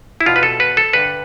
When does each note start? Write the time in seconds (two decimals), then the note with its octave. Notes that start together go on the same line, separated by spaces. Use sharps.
0.21 E4
0.26 E2 B2 F4
0.36 B4
0.43 A4
0.60 B4
0.77 A4
0.93 G2 D3 B4